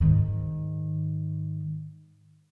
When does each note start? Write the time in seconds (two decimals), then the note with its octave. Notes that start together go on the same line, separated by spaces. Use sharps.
0.01 G#2 D#3